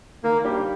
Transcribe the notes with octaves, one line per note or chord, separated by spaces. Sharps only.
D#3 A#3
G3 D4 G4